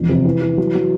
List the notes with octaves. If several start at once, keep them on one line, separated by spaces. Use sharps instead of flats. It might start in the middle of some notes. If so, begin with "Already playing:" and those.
Already playing: E1 F2
C3
E3
E3
F#3
F#3